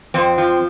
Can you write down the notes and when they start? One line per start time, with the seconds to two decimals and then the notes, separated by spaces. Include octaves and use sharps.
0.14 F2 C4
0.38 F3